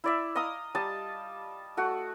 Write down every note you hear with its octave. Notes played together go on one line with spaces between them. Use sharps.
E4 D5 E5
D#5 F5 A#5 D#6
G3 A5 D#6
A3 F#4